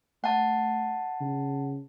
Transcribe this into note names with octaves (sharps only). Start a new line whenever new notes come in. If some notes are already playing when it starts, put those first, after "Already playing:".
A3 F#5 A5
C#3